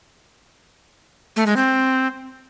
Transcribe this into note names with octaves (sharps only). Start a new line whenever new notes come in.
A3
G#3
C4